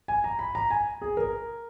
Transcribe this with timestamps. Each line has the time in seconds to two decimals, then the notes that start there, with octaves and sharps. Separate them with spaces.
0.08 G#5
0.24 A#5
0.39 B5
0.55 A#5
0.71 G#5
1.02 G#4
1.17 A#4